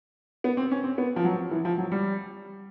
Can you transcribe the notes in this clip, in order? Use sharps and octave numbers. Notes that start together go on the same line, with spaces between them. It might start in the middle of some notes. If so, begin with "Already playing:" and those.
B3
C4
C#4
C4
B3
F3
F#3
E3
F3
F#3
G3